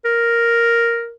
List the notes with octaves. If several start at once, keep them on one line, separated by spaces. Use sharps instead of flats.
A#4